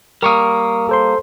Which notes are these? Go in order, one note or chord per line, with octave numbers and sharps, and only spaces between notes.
G3 A#3 A#4 C#6 D#6
A4 C5 C6